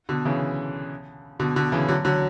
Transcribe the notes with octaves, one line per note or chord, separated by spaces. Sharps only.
B2 D3
C#3 E3
B2 D3
B2 D3
C#3 E3
D3 F#3
D3 F#3